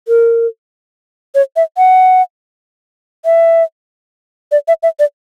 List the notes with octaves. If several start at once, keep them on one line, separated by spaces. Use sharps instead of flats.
A#4
C#5
E5
F#5
E5
D5
E5
E5
D5